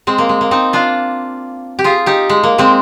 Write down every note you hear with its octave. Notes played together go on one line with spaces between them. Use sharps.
G#3 C4
A#3
G#3
A#3
C4 D#4
D4 F4
G4
F4 G#4
D#4 G4
G#3
A#3
G#3 C4